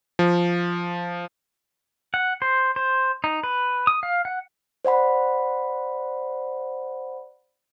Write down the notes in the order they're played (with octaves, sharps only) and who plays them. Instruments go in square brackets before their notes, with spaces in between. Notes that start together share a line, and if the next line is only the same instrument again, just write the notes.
[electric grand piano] F3
[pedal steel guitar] F#5
C5
C5
D#4
B4
D#6
F5
F#5
[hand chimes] C5 D5 F#5 B5